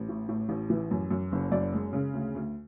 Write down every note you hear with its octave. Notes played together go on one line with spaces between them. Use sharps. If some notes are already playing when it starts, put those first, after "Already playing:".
Already playing: A1
A2
A2
A1
E3
F#2
F#2
F#1
F#2 D5
G#3
C#3
D2
D2